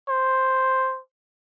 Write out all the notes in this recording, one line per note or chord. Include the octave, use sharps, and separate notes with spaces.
C5